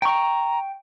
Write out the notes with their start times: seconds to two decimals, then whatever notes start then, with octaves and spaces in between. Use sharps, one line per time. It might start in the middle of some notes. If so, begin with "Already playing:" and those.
0.02 G5 A#5 C#6